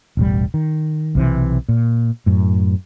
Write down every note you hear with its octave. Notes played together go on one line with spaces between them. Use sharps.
E1 A1 G3
D#3
B1 C3 E3
A#2
F#2 A2